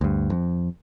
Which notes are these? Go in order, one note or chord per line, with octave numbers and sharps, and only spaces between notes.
D2 G2
F2